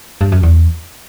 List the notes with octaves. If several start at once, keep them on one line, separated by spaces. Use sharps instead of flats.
G2
F#2
E2